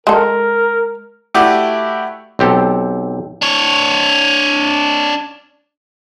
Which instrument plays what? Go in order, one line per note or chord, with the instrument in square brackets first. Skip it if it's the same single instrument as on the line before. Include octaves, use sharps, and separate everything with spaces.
[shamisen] G#3 A4 [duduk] A#4
[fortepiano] A3 E4 F#4 G4 D5
[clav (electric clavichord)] B1 C4 G4 A4
[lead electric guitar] D4 C#5